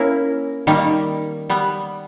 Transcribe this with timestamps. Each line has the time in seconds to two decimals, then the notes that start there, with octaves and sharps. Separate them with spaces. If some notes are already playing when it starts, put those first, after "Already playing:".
Already playing: A#3 C#4 E4 A#4
0.67 D#3 G3 A#3
1.50 G3 B3